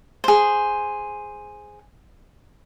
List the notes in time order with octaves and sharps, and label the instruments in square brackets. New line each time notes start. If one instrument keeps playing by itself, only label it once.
[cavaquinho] G#4 C5